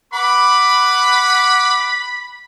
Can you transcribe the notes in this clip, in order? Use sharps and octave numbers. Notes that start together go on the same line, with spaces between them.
B4 F#5 B5 D6